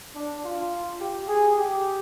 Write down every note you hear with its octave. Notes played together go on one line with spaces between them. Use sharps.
D4
F4
G4
G#4
G4